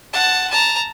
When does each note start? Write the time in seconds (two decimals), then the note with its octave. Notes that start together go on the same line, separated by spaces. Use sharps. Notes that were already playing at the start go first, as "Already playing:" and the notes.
0.13 F#5 A5
0.51 A5 A#5